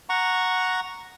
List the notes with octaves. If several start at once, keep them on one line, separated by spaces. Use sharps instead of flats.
F#5 A#5 C#6